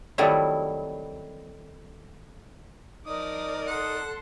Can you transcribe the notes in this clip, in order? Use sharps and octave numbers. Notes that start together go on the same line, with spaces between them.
C3 D#3 F#3 G3 A3 E4
F3 D#4 A#4 D5 D#6
A4 F#5 C6